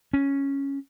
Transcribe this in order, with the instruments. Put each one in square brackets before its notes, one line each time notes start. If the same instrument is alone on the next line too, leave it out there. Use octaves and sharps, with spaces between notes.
[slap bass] C#4